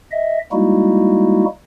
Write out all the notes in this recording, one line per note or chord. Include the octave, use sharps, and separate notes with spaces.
D#5 E5
G3 G#3 A#3 D#4 E4 F#4